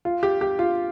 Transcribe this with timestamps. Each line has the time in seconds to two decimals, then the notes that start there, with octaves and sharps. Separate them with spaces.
0.05 F4
0.23 G4
0.41 G4
0.59 F4